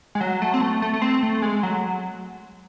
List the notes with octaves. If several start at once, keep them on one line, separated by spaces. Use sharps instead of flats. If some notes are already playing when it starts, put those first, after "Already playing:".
G#3
F#3
A3
C4
A3
A3
A3
C4
A3
G#3
F#3